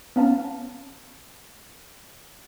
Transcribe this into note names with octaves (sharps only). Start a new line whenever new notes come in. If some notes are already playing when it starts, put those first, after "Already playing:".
B3 C#4 F5 A5